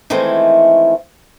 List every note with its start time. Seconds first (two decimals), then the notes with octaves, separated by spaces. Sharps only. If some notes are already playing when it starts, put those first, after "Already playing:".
0.10 D#3 E3 G#3 A3 C4 E4